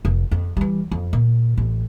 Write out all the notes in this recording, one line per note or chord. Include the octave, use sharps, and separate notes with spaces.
F1
F2
E3 G3
F2
A#2
A1